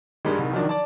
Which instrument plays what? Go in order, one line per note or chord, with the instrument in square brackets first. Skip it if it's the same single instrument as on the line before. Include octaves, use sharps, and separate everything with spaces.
[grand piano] G2 G3 G#3 [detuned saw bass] D#3
[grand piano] C2
F3 F#3 D4
D5 A5